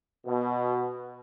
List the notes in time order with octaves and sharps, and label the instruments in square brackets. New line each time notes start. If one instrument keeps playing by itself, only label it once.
[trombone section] B2